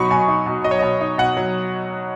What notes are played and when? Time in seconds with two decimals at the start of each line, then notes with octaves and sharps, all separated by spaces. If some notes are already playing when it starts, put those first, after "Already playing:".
Already playing: B2 F#3 D#4 B5 C#6 D#6
0.10 B2 G#5
0.28 D#4
0.46 B2
0.64 F#3 D#5
0.71 C#5
0.79 B2 D#5
1.01 D#4
1.18 B2 F#5
1.37 F#3